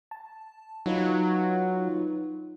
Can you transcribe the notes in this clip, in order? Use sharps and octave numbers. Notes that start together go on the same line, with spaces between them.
A5
F#3 D#4 F4 B4